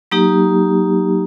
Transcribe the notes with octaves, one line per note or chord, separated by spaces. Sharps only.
F#3 A#3 D#4 G4